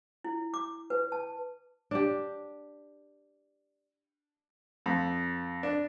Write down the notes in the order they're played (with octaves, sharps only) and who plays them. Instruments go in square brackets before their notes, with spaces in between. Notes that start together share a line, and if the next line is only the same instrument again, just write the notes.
[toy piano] E4
D6
B4
A5
[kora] D4 G4
[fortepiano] F2
D4